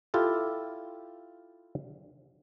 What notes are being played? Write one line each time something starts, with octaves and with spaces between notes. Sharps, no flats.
E4 F4 G4 A4